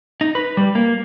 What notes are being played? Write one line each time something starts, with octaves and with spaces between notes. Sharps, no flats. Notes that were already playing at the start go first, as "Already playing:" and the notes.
D#4
B4
G3
A#3